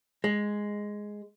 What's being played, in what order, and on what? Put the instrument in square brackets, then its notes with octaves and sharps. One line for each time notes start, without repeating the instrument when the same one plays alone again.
[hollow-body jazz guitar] G#3